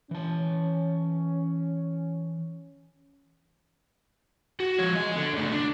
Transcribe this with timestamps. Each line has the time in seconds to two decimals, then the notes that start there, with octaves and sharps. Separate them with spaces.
0.11 E3 C#4 A5
4.60 F#4
4.79 F3 C#5
4.95 G#4 D#5
5.16 D3
5.33 C#3 A3
5.52 D4